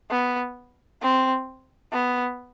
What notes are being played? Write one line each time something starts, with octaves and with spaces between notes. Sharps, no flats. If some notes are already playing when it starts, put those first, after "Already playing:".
B3
C4
B3